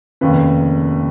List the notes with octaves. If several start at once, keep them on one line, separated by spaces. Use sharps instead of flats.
F1 D#2 C#3 B4